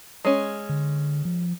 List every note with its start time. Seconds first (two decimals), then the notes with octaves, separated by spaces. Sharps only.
0.25 G#3 C#4
0.69 D3
1.25 F3